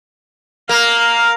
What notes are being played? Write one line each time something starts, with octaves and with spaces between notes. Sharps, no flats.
A#3 F5